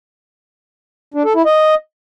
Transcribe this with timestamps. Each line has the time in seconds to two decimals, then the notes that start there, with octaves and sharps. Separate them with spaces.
1.14 D4
1.25 A4
1.35 E4
1.46 D#5